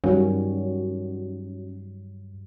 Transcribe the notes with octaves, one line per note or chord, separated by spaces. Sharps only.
G2 D#3 F#3 G3 C#4 F#4